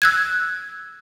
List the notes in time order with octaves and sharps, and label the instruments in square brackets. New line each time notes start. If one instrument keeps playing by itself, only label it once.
[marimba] E6 F#6 G#6